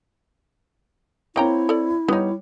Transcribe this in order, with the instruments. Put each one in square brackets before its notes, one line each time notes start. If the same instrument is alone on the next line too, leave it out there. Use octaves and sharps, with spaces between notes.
[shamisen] A#3 G5 A#5 [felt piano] C4 C#5 [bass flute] E4
[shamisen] A4 D5
[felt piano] G3 C#5 [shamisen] B3 D#4